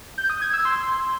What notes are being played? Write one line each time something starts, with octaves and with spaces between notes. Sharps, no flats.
G6
D#6
G#6
E6
C6